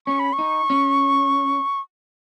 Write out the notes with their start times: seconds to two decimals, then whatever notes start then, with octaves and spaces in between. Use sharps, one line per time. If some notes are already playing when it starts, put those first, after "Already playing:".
0.07 C#4 C#6
0.19 B5
0.33 C#6
0.39 D#4
0.70 C#4